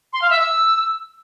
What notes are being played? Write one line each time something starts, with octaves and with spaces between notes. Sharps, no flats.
C6
F5
E5
E6